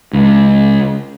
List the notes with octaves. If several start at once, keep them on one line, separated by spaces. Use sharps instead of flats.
C#2